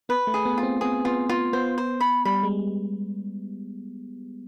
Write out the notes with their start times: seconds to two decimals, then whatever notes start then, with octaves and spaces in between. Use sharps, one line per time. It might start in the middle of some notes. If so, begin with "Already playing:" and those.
0.09 B3 B4
0.27 A3
0.34 G#4
0.45 B3
0.58 F4
0.63 C4
0.81 B3 G#4
1.05 B3 F4
1.29 B3 F4
1.53 B3 C5
1.78 C5
2.01 B5
2.25 G3 B5
2.43 G#3